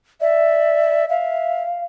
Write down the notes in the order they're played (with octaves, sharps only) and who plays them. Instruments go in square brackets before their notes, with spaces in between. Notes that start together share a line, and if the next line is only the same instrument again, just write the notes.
[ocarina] D5 [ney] E5
[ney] E5 [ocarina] F5